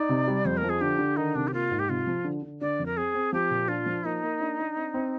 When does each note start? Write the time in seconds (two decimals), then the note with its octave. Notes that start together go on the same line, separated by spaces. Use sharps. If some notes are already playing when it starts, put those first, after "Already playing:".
Already playing: D#4 D5
0.09 C3
0.28 G3
0.45 F2 C5
0.57 A#4
0.63 F3
0.69 G#4
0.81 D3 G4
0.99 D3
1.17 D#3 D#4
1.35 C3 D4
1.48 G4
1.53 A#3 F4
1.71 G#2
1.79 G4
1.89 C3 F4
2.07 F3
2.25 D3
2.43 D3
2.61 D3 D5
2.80 F2
2.86 A#4
2.97 C4 G#4
3.14 C4
3.33 F3 G4
3.51 A#2
3.68 D4 F4
3.86 F3
4.04 A#3 D#4
4.23 A#3
4.40 D4
4.59 D4
4.76 C4
4.94 C4